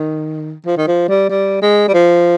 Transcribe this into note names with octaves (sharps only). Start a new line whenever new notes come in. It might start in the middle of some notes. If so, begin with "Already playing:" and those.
Already playing: D#3
F3
D#3
F3
G3
G3
G#3
G3
F3